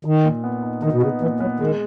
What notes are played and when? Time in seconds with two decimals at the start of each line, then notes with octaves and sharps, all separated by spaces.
0.05 D#3 D#4
0.24 A#2
0.44 B3
0.63 D#4
0.82 D#3 D#4
0.92 B2
1.02 C#3 B3
1.21 A#2 E3
1.40 F#3 B3
1.60 D#3 G#3